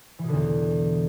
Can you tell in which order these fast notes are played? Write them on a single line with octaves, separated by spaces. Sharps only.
E3 B2 D3 E2